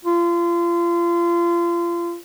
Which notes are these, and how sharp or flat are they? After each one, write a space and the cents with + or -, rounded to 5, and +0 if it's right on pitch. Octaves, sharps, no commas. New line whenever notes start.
F4 -30